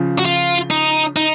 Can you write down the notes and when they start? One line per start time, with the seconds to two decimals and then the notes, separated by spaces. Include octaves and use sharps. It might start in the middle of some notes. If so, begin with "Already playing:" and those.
Already playing: C#3 F3
0.19 F#4
0.25 F4
0.71 D#4
1.17 D#4